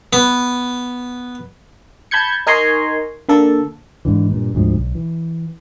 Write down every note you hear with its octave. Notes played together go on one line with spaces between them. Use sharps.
B3
A5 B5 G6 G#6 C#7
D#4 A#4 G#5 A#5 C6 C#6
D3 A#3 A4
G#2 D3 E3
G2 A#2
D2 G#2 F3
B1
E3